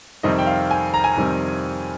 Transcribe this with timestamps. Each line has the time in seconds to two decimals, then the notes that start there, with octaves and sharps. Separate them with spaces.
0.23 F2 C3 D#3 G3 C4 D#5
0.39 G5
0.47 F5
0.71 G#5
0.94 A#5
1.04 G#5
1.14 F2 C3 D#3 G3 C4 A#5